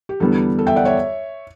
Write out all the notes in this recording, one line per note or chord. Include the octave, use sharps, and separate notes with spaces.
G4
E2 D3 G3 B3 A4
A4
E5 G5
D5 F#5
C#5 E5